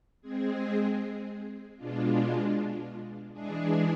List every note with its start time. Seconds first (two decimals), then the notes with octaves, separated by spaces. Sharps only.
0.21 G#3 C4 G#4
1.77 B2 G#3 D4 F4
3.33 E3 G#3 D4 G#4